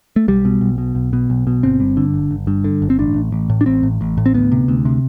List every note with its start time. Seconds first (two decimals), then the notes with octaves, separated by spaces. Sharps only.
0.16 A3
0.28 B1 G3
0.45 B2
0.61 B1
0.78 B2
0.95 B1
1.13 B2
1.30 B1
1.47 B2
1.63 G1 C4
1.80 G2
1.97 D3
2.14 G1
2.31 G1
2.47 G2
2.64 D3
2.82 G1
2.90 C4
2.99 A1 D4
3.16 A2
3.32 A1
3.49 A2
3.61 D4
3.66 A1 C4
3.83 A2
4.01 A1
4.17 A2
4.26 C4
4.34 D2 B3
4.52 C3
4.68 D2
4.85 C3